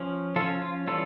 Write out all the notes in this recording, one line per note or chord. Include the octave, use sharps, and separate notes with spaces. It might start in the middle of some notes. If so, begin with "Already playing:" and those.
Already playing: F3 C#4
F3 C#4 F4 A4
F4
E3 G3 C#4 F4 A4